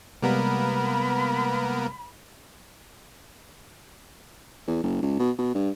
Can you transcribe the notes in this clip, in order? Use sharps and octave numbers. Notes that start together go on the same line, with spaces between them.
C3 G3 G#3 A#3 B3 A#4 B5
E2
F#1
C#2
B2
B2
G2